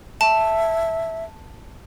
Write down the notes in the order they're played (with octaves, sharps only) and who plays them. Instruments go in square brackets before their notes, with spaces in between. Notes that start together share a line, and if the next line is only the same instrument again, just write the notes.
[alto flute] E5 [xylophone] A5